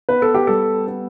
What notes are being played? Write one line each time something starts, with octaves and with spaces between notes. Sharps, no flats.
B3 B4
A4
G4
G3 A4
B3